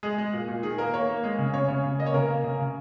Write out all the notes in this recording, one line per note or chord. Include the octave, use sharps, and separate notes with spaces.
G#3 G#4
G#3
A#2
A#2
D#3 G#4
A#3 A#4
A#3 C#5
A#3
G#3
C#3
C#3 C#5
C#3 C#5
C#3
A#3 D#5
C#5
C#3 A#4
A#3
C#3
C#3